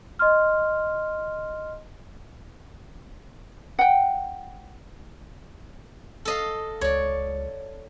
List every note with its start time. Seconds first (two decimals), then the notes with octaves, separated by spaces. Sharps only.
0.19 D#5 C6 F6
3.79 F#5 G5
6.25 A4 D#5 F5
6.81 C#2 C#5 D5